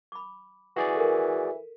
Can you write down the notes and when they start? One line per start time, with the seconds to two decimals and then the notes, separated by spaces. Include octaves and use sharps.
0.12 B5 D6
0.76 E3 F#4 G#4 D5
0.95 A4 A#4